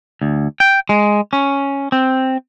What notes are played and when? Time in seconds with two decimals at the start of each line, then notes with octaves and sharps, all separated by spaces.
0.22 D2
0.60 G5
0.89 G#3
1.33 C#4
1.92 C4